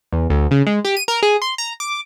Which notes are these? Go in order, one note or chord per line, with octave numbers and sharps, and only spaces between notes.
E2
D2
C#3
G#3
G4
D#7
A#4
G#4
C6
A#5
D6